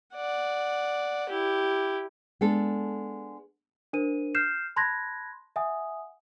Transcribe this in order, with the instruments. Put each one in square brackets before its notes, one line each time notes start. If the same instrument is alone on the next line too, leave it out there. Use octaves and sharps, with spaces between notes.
[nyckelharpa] D5 F#5
E4 G4
[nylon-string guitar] G#3 B3 D4 A4
[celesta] D4 A#4 C5 D#7
F6 G6 C7 E7
A5 B5 C6 F#6 G#6 A#6
E5 F#5 G#5 D#6